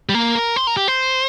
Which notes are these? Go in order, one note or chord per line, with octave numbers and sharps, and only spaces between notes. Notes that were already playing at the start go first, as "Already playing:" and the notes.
G3
A#3
A#4
C5
A#4
G4
C5